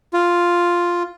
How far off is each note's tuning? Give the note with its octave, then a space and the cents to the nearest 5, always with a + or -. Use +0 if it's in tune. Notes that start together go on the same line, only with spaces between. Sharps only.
F4 +0